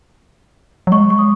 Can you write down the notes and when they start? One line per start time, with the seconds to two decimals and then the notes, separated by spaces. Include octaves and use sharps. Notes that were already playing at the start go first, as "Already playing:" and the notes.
0.87 F#3
0.92 G#3 C#6
1.10 C#6
1.19 D#6